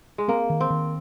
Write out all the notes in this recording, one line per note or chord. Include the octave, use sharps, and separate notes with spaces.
G#3
A#3 C4
D#3
C4
D#3